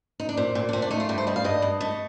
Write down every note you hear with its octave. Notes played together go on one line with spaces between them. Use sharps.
D#4
D4
A#2 C4
A#2
D4
A3 C4
D4
A3 D#4
F4
G2 G4
C5
G3 D#5
F5
G2 D#5
G2
A3 D#5